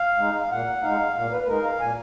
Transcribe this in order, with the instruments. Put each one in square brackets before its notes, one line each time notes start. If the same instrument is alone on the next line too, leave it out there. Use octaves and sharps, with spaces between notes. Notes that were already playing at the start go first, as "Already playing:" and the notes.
Already playing: [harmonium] F5
G#3 D#4
F5
A#2 F#5
G#3 D#4 F5
A#2 F5
B4
B4
G#3 D#4 A#4
F5
A#2 G#5